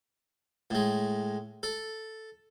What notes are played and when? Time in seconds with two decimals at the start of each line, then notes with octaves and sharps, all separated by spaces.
0.70 A2 G#3
1.63 A4